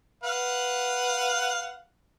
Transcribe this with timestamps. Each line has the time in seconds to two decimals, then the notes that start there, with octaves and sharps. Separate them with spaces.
0.23 B4 F5 F#5